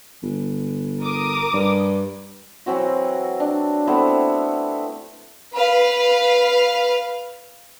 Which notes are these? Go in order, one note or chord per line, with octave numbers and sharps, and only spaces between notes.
G1
A#4 D6 D#6
G2
E3 F#3 C4 F#4
D4
A3 B3 C4 E4
B4 F5